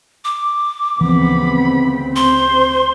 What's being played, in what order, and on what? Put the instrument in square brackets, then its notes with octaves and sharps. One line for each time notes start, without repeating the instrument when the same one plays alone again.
[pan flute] D6
[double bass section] D2 C#3 C4 [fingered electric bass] E3 F3 [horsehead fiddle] B3 B5
[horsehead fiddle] C5 [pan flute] C6